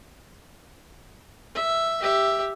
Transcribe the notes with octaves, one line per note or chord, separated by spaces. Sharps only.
E5
G4 E5